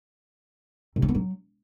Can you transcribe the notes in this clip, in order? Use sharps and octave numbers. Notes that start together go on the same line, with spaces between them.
C3
C4
B3
F#3